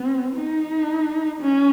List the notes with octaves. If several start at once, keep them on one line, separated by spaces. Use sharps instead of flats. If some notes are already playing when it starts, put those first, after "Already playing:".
Already playing: C4
D#4
C#4